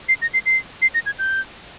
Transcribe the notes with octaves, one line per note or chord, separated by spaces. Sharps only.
C7
A#6
C7
C7
C7
A#6
G#6
G6